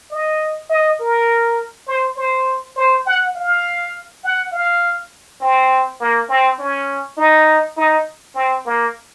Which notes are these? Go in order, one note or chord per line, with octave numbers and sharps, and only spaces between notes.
D#5
D#5
A#4
C5
C5
C5
F#5
F5
F#5
F5
C4
A#3
C4
C#4
D#4
D#4
C4
A#3